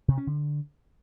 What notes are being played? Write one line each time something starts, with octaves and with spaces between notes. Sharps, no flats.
C3
C#4
D3